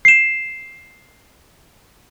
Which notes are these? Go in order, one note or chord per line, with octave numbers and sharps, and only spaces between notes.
C7 E7